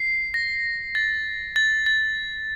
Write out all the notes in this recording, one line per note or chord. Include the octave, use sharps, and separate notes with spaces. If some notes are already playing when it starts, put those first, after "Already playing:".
Already playing: C7
A#6
A6
A6
A6